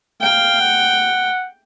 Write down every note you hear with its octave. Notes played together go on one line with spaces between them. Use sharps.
F5 G5
F#5